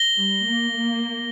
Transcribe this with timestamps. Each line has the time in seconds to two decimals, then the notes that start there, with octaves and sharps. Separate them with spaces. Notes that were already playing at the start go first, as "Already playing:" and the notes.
Already playing: A#6 G7
0.16 G3
0.45 A#3
0.75 A#3